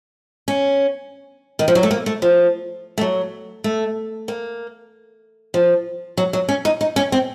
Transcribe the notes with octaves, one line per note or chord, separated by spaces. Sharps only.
C#4
D#3
F3
F#3
A3
A#3
A3
F3
A3
F#3
A3
A#3
F3
F#3
F#3
C#4
D#4
D#4
C#4
C4